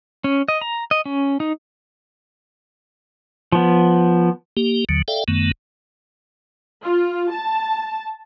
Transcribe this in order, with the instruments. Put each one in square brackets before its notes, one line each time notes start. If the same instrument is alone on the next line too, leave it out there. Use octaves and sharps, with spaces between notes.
[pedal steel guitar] C#4
D#5
A#5
D#5
C#4
D#4
F3 B3
[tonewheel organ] A#3 G4
D#2 D3 F#3
A4 D5 E5 F5 G5
F#2 D#3 A3 B3
[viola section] F4
A5